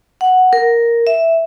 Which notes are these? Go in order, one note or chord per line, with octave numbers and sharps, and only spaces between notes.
F#5
A#4
E5